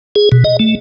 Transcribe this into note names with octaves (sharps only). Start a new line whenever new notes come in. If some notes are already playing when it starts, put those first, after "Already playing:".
G#4
B2
D#5
A3